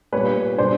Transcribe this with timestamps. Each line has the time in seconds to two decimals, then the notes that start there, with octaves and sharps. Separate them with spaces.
0.12 A#2 G3 B4 C#5
0.58 B2 G3 C5 D5